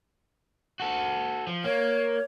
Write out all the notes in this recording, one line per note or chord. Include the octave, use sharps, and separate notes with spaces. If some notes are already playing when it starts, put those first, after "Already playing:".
F#4 A4
F3
A#3 C#5